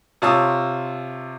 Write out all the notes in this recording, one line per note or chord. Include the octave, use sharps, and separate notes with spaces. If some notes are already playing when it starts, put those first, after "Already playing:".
C3 F4 C#5 A5 D#6 E6